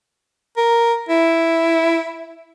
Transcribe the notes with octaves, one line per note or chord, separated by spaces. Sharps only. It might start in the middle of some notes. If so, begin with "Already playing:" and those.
A#4
E4